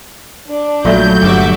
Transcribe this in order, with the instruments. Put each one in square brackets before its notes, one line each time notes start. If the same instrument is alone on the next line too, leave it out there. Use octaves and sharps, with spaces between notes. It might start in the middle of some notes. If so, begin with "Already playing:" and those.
[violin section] D4
[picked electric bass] A#1 [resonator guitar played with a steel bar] A#2 A3 [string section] F#3 G6
[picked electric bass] G1 G2 [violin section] F#4 E5 D6